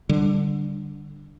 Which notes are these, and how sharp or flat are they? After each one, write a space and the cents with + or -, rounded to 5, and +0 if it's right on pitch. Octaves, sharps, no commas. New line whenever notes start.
D3 +0 G3 -5